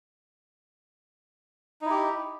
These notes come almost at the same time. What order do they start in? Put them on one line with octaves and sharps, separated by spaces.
D#4 E4 G4